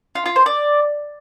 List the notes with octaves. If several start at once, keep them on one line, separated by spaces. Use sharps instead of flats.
F4
F4
C5
D5